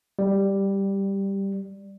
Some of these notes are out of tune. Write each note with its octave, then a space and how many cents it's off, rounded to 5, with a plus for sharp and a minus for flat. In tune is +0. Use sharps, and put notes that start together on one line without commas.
G3 +0